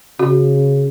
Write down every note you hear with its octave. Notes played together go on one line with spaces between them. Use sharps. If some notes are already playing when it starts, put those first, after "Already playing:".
C#3 F#4